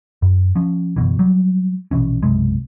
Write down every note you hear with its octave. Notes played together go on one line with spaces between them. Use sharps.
F#2
F3 C#4
F#1 C#2 B2 E3
F#3 G3
A#1 B2 E3 C#4
B1 F#2 C3 G#3